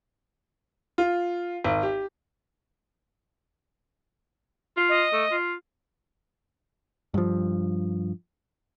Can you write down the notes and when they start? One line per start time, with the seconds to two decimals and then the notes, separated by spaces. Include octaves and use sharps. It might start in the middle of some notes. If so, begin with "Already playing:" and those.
0.98 F4
1.64 G#1
1.83 G4
4.77 F4
4.89 D#5
5.13 A3
5.32 F4
7.14 G2 F3